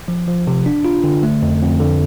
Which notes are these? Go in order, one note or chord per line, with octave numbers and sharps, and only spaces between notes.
F3
F3
C3
D4
F4
D3
A3
F2
F2
D3